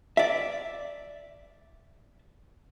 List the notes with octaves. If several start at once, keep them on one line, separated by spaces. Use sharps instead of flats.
D5 E5